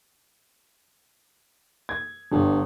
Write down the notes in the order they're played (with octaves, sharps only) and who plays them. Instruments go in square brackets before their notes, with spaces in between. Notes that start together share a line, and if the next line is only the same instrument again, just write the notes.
[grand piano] G#6
[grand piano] G1 [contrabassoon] G2